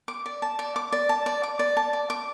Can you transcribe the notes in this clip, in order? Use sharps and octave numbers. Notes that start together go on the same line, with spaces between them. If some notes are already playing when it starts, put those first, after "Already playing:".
D6
D5
A5
D5
D6
D5
A5
D5
D6
D5
A5
D5
D6